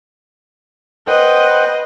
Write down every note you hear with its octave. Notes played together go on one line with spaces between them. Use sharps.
B4 C5 D#5 F#5 G5